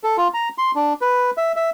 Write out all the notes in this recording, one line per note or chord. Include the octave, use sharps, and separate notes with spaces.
A4
F4
A#5
C6
D4
B4
E5
E5